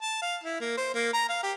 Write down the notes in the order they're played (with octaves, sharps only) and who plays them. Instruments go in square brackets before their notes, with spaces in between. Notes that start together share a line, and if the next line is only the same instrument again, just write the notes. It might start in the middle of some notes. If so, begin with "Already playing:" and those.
[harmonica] A5
F5
E4
A#3
C5
A#3
A#5
F5
G4